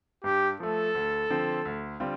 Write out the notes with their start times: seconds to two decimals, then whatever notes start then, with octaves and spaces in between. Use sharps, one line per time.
0.24 G2 G4
0.60 F3 A3 A4
0.95 D2
1.30 D3 F3 C4
1.65 D2
2.00 D3 G3 C4 F4